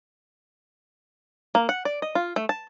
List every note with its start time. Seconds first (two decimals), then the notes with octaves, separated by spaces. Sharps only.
1.55 A#3
1.69 F#5
1.85 D5
2.02 D#5
2.15 F4
2.36 A3
2.49 A5